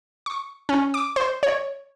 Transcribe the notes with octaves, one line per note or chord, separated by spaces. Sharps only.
C#6
C#4
D6
C5
C#5